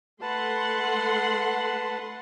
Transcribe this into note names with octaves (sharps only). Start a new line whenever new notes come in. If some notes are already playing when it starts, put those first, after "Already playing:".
A3 B4 F#5 A5 C6